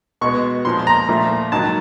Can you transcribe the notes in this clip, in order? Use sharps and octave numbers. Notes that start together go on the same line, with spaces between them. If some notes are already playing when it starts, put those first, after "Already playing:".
B2 G#3 B3 C#6
A#2 F3 G#3 C6
A#5
A#2 F3 A3
G#2 D#3 F#3 A5